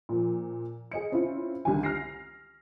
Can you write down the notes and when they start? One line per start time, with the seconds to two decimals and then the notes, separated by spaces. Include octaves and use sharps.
0.09 A#2 F3
0.92 G#4 D#5 C#7
1.12 C4 C#4 E4 F4
1.65 C2 D3 D#3 G#5
1.83 F6 A#6 C7